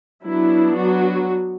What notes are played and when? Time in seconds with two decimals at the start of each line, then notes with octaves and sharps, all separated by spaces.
0.25 F#3 B3 D4 E4
0.77 F#3 F#4